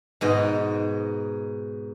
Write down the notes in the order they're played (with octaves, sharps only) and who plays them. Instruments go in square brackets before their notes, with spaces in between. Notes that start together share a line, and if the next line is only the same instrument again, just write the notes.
[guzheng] G#2 B2 D#5